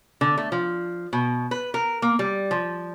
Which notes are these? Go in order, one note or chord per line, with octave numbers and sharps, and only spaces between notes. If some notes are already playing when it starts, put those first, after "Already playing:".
D3
A3
F3
B2
B4
A#4
A#3
G3
F3